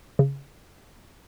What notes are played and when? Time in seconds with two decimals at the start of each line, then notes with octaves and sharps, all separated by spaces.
0.19 C#3